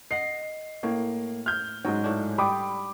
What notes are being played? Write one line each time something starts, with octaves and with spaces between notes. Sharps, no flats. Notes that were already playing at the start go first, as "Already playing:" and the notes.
D#5 F#5 C7
A2 A#3
F6 G6
G#2 F#3 G#3
A2 D4
G3 B5 D6 D#6